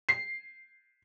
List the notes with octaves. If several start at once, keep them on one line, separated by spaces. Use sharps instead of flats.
C7